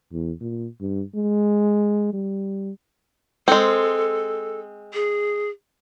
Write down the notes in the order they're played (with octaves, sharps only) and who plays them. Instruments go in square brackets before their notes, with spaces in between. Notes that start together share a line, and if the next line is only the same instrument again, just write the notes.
[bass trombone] E2
A#2
G2
G#3
G3
[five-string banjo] G#3 C4 [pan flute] A4
[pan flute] G#4